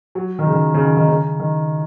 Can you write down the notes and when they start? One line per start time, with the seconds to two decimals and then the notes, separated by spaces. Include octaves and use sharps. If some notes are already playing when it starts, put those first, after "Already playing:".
0.15 F#3
0.39 D#3
0.47 C#3
0.53 D#3
0.74 C#3
0.85 D#3
0.97 D#3
1.09 C#3
1.40 D#3